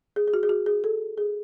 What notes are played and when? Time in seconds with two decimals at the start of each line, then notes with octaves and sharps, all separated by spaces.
0.16 G#4
0.28 G#4
0.34 F#4
0.43 G#4
0.49 F#4
0.66 G#4
0.84 A4
1.18 G#4